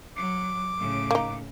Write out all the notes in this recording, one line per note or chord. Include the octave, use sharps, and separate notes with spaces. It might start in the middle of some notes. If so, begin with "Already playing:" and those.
F#3 D6
A2 C#3
A#3 D#4